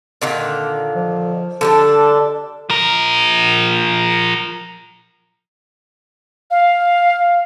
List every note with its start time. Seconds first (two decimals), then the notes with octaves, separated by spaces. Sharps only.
0.22 A#2 D3 D#3
0.95 F3
1.61 D3 G3 D4 A4
2.70 F3 A#4
6.51 F5